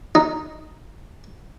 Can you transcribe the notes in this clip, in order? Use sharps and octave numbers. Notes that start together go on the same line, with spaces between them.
D#4